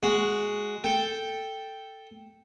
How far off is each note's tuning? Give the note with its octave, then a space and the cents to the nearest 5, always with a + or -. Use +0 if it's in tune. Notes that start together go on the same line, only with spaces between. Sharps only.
G#3 +0 F#4 +0
A4 +0 G5 +0